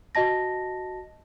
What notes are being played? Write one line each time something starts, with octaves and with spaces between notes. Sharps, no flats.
F#4 D#5 A5 A#6